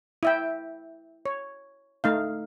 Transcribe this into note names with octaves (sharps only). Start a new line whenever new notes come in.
E4 E5 G5
C#5
A3 D#4 F5